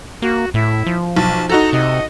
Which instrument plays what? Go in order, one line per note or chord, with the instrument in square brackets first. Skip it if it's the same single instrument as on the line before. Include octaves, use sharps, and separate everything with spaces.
[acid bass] A#3 [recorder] F#4
[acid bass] A2 [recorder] E4
[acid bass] F3
[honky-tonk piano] B1 [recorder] A5
[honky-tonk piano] D#4 F#4 A4 [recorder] A#5
[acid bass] C3 [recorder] D#5